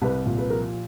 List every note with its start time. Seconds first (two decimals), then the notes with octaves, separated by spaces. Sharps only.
0.02 C2 B4
0.26 A#2
0.38 B4
0.50 F3 A#4